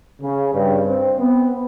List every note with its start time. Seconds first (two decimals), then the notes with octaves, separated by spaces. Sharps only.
0.22 C#3
0.54 G2
0.87 C4
1.19 B3